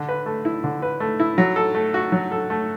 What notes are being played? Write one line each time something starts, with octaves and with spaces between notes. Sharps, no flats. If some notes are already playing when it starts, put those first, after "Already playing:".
Already playing: D3
B4
A3
E4
D3
B4
A3
E4
F#3
A4
A3
F#4
F#3
A4
A3